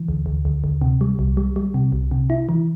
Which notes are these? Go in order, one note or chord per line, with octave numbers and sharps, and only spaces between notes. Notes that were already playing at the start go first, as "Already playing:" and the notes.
Already playing: E3
D2
D2
D2
D2
C3
G3
C2
G3
G3
C3
C2
C3
E4
E3